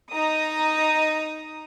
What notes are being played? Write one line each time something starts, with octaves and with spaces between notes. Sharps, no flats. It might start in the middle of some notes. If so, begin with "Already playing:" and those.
D#4 A#5 D#6